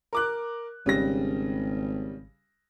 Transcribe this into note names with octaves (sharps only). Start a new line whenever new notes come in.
A#4 D6 F#6
G#1 C#3 G3 A#6